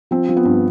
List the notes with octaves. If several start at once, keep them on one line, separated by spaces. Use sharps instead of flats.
F3 C4
F3
B3
G2